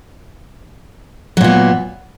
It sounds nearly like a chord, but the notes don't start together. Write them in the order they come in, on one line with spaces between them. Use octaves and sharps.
F#3 A#2 B3